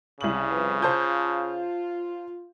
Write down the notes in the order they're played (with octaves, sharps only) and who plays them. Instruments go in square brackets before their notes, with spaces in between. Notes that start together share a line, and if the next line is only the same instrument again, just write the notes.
[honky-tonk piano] C2 F#7 [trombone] C#3
[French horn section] F2 B4
[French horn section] F4 [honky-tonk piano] C5 A5 G6